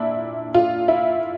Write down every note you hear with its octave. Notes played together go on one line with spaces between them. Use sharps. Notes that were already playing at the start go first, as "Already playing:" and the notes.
Already playing: A#2 D4 E4
F4
E4